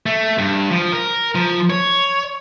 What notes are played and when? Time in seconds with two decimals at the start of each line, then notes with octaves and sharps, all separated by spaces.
0.06 A3
0.38 G2
0.71 F3
0.92 A#4
1.35 F3
1.70 C#5